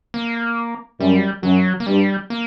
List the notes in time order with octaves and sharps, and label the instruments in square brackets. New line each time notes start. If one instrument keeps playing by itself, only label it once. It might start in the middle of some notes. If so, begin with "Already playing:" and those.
[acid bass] A#3
[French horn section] F#2 [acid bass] G3
[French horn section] F#2 [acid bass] F#3
[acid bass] A#3
[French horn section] G2 [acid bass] G3
[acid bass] A#3